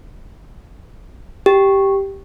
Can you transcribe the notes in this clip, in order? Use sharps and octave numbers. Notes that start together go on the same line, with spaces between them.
G4